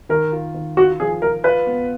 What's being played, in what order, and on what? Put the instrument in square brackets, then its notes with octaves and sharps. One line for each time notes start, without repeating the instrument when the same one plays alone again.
[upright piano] D#3 [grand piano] A#4
[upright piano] F4
D#3
[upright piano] F4 [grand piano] F#4
[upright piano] F3 [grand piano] G#4
[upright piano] F3 [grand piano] A#4
[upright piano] F4 [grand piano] B4
[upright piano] B3